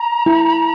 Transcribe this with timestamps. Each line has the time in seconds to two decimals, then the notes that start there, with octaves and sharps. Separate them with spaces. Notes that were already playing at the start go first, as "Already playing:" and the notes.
Already playing: A#5
0.26 E4